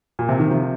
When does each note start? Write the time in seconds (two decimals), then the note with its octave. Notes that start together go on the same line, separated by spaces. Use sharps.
0.19 A#2
0.29 C3
0.39 D#3
0.50 C3 F3